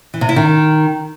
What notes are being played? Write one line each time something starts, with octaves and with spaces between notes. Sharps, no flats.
E3
C3
E4
D#3